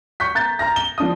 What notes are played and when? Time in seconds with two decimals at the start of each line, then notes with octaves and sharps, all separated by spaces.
0.20 C#6 G6 B6
0.35 A#5 G6 A6
0.59 A#5 F6 A#6
0.76 G7
0.98 F3 D4 D#6